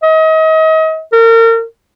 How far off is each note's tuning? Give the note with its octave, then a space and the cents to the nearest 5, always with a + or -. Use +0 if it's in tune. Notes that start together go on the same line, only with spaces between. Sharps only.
D#5 +35
A#4 -35